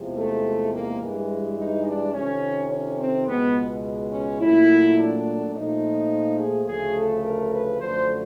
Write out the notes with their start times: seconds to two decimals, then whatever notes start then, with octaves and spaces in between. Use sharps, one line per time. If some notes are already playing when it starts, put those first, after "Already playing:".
Already playing: E2 C3 F3 G#3
0.15 A3
0.71 A#3
0.99 G2 E3 G#3
1.57 D#4
1.84 D4
2.13 F2 C3 D#3 C#4
2.70 C#4
2.99 C4
3.26 C#2 B2 G#3 B3
4.11 C#4
4.40 A#2 F#3 A3 E4
4.97 D4
5.54 A#2 F3 A3 D#4
6.38 G#4
6.66 D2 C#3 F3 A3 G#4
6.95 A4
7.23 A#4
7.52 B4
7.81 F#2 D3 F3 A3 C5